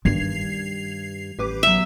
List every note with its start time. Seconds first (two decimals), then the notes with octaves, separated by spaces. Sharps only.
0.05 G2 D#3 D4 G#6 C7 F7
1.39 A1 G4 B4 D6
1.63 F#3 B3 E5